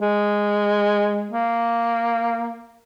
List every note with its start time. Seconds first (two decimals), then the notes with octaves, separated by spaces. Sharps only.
0.01 G#3
1.32 A#3